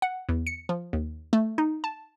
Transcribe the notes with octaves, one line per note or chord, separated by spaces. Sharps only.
F#5
E2
C#7
F3
D#2
A3
D#4
A5